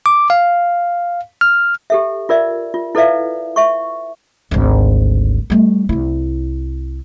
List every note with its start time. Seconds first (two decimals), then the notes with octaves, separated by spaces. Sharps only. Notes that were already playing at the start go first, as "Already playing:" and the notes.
0.06 D6
0.30 F5
1.41 F6
1.90 G4 A4 E5
2.29 F4 A#4 D5 E5
2.74 F4
2.95 E4 A4 B4 D5 E5 F5
3.56 E5 C#6
4.51 G#1 D2
5.50 G3 A3
5.89 C2 E4